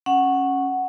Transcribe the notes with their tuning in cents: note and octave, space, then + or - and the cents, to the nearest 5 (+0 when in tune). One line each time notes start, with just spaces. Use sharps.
C#4 -10 F#5 +0